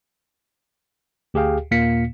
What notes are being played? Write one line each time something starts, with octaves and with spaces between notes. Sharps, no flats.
D2 G4 G#4 F5 G5
D#2 A#2 A#3 F5 B6 C#7